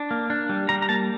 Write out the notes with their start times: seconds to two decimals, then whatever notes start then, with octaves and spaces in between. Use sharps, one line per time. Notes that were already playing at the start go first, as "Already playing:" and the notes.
Already playing: D4
0.11 A#3
0.30 D4
0.49 G3
0.69 G3 A#5
0.82 A#5
0.89 A#3 A5